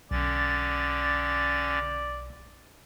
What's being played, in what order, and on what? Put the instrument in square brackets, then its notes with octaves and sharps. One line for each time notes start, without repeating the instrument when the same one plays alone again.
[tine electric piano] B1 [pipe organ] D3 C#4 A6 [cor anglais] D5